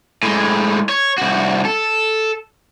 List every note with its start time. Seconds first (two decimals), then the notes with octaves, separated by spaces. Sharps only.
0.23 A2 G#3
0.89 C#5
1.18 C2 F#4
1.65 A4